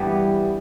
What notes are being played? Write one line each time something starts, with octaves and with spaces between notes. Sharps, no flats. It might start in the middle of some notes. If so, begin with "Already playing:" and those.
Already playing: G2 E3 G3 B3